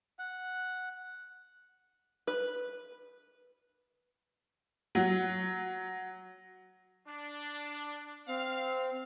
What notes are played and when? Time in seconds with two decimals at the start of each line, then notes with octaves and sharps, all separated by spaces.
0.19 F#5
2.27 B4
4.95 F#3
7.08 D4
8.28 C4 F5